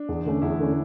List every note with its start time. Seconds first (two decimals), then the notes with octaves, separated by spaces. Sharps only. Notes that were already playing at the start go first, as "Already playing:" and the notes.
Already playing: D4
0.09 E2
0.25 D3 A3 C#4
0.42 E2 E4
0.59 D3 A3 C#4